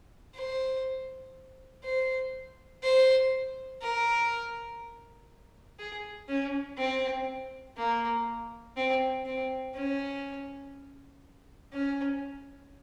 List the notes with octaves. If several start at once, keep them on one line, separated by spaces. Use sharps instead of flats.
C5
C5
C5
A#4
G#4
C#4
C4
A#3
C4
C4
C#4
C#4